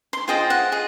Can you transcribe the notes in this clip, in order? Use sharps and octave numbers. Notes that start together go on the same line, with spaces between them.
C6
F4 G#4 C5 D#5 G5
F#5
F4 G#4 D#5